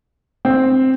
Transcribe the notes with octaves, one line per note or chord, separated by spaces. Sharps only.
C4